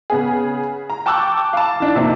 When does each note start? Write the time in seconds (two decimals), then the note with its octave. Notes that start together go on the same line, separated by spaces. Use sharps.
0.10 C#3 B3 G#4
0.90 A#5
1.06 G5 A5 C#6 D6 E6 F#6
1.53 F5 A5
1.80 E3 D4 D#4
1.95 F2 C3 E3 A#3 C4 D#4